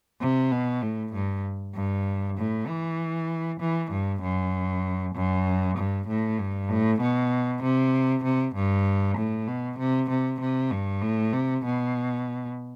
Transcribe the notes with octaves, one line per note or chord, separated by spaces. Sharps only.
C3
B2
A2
G2
G2
A2
E3
E3
G2
F#2
F#2
G2
A2
G2
A2
B2
C3
C3
G2
A2
B2
C3
C3
C3
G2
A2
C3
B2